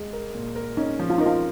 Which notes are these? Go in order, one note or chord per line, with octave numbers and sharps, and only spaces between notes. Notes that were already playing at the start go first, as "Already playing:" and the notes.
Already playing: G#3
A#4
A#2
A#4
C#4 D#4
F3
F4
D#4 A#4
F4